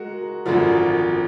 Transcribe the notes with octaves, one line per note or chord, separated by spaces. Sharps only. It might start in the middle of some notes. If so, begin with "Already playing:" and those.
Already playing: G#3 F#4 A#4 F#5
G#1 F#2 D3 F3